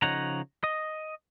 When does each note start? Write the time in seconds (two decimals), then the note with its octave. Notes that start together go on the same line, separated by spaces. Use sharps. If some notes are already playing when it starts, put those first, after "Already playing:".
0.02 C#3 F3 D#4 C#5 F#5 A#5
0.64 D#5